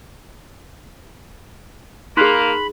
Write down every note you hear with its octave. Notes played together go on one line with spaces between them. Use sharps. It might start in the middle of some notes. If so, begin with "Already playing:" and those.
A#3 D#4 G#4 B5 C6 F#6 B6